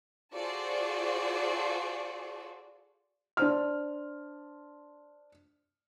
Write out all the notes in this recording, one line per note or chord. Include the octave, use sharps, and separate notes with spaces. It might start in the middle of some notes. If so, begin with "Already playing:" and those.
F4 F#4 G#4 A4 C5 D5
D4 C5 F6